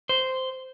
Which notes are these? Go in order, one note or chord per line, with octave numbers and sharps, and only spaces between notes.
C5